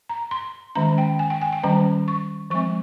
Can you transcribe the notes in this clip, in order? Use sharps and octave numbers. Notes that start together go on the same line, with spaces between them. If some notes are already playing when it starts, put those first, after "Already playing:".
A#5
C6
D#3 G#3 C#4 A#5
G5
G#5
G5
G#5
G5
D#3 G3 C#4 A#5
C#6
F3 G#3 C4 C#6